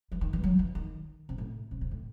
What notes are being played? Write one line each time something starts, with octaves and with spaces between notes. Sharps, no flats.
E3
D#3
E3
F#3
E3
D#3
C3
A2
C3
C3
A2